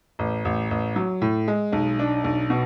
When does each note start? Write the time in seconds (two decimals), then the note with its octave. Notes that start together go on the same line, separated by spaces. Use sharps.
0.19 A1
0.45 A1
0.71 A1
0.96 F#3
1.22 A2
1.48 G#3
1.73 B1
1.99 D4
2.24 B1
2.50 B2